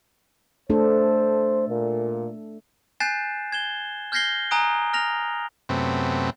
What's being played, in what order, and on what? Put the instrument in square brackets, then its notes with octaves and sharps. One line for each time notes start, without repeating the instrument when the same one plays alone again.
[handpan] A3 D4 A4 [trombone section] C5
[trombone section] A#2
[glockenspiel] G#5 F#6 G6 A6 C7 E7
G#6 E7 G7
F6 G6 G#6 A#6 C7 G7
G#5 A#5 D#6 F#6 D7
F6 A#6 F7
[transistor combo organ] F#2 C3 A3 B3 C4